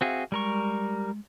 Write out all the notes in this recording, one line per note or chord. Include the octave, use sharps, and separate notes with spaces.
C4 F#4 G#4 E5 F5
G3 G#3 A#4 C#6